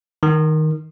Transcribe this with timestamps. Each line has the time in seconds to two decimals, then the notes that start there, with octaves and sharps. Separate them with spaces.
0.23 D#3